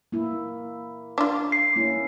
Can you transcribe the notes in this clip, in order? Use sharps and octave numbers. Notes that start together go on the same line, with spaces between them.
A#3 E4
D4 F4
C7
A#3 C#4 E4